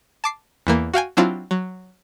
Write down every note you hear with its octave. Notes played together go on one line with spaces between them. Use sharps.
A5 D6 C7
E2 E3 A#3
F#4 F5 G5 G#5
F#3 C4 D4 E4 F4
F#3